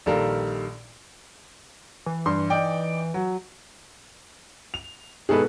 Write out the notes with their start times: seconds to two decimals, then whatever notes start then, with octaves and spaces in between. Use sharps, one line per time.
0.06 A#1 D#3 G3 A4 A#4 F5
2.06 E3
2.26 G2 C6
2.50 D#4 D5 G5
3.14 F#3
4.74 F7
5.29 G#2 B2 D#3 G#4 A4 B4